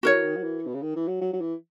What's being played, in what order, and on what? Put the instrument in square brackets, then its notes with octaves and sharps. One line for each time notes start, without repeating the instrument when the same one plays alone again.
[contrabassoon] D#3 [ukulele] F#4 A#4 C#5
[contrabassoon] E3
D#3
F#3
E3
B2
C#3
D#3
E3
F#3
F#3
F#3
E3